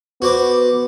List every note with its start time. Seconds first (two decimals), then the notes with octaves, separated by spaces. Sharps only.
0.22 B3 F#4 C5 D6